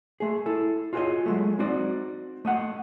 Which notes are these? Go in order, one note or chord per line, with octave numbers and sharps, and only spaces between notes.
A3 G#4
E4 A4
F4 F#4 G#4 A#4 C#5 D#5
F#3 G#3 A3
C4 D#4 F#4 D5
A3 D#5 F#5